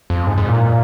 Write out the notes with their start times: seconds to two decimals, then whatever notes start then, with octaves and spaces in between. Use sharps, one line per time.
0.10 F2
0.27 G#2
0.38 G#2
0.48 A#2